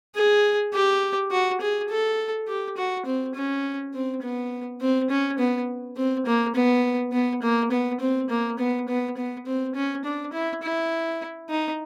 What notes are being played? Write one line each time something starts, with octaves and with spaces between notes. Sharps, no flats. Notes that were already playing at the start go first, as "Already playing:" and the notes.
G#4
G4
F#4
G#4
A4
G4
F#4
C4
C#4
C4
B3
C4
C#4
B3
C4
A#3
B3
B3
A#3
B3
C4
A#3
B3
B3
B3
C4
C#4
D4
E4
E4
D#4